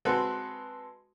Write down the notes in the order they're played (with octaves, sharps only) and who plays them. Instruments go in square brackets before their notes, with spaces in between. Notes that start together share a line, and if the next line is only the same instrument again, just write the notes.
[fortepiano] G#3 C4 F#4 A4 B4